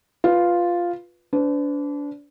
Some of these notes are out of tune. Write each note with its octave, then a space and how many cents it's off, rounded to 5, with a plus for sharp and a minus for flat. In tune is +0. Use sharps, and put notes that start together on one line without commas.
F4 +0 B4 +0
D4 -30 B4 +45